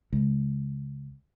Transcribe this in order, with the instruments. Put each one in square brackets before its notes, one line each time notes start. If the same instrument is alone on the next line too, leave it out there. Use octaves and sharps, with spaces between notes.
[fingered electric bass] C#2